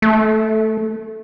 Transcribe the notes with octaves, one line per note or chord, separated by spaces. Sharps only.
A3